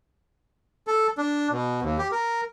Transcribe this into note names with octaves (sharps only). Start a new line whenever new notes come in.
A4
D4
B2
D#2
G4
A#4